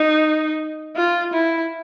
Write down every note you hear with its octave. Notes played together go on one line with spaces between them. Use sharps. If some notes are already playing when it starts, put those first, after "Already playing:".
Already playing: D#4
F4
E4